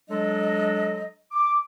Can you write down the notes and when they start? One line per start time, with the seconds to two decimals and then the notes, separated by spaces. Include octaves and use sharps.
0.10 F#3 G#3 D4 A4 D#5
1.32 D6